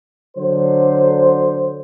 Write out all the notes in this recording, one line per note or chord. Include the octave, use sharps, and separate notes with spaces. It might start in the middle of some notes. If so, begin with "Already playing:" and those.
D3 F#3 C5